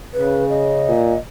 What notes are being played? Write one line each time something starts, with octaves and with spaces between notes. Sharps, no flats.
C#3 B4
D#5
A#2